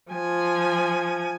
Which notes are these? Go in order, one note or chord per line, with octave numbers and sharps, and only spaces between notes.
F3 G#5